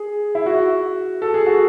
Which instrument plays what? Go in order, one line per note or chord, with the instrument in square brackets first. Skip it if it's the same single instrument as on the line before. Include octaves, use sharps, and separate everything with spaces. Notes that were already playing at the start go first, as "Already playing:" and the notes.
Already playing: [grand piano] G#4
E4
F#4
A4
G#4
F#4